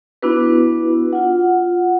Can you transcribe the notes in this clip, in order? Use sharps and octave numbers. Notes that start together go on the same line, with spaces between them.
B3 D4 E4 F#4 B4
F4 F#5